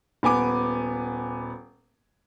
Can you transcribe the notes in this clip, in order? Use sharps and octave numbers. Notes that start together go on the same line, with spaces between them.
D#1 B3 G#5 D6